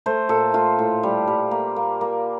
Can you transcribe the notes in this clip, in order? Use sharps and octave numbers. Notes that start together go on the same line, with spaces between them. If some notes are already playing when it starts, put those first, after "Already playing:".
A3 C5
A#2 A4
A3 F4
A2
G3
G3
A#3
A#3
A#3